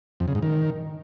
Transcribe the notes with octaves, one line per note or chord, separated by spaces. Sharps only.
F2
C#3
G#2
D#3